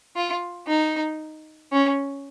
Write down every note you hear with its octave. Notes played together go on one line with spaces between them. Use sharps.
F4
D#4
C#4